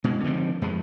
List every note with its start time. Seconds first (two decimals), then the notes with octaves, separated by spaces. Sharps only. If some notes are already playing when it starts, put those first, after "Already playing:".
0.04 B2 G#3
0.24 D3 D#3 F3 C4
0.62 F2 F3 G#3